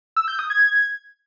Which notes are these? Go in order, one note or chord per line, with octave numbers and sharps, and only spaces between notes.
E6
G6
D#6
G#6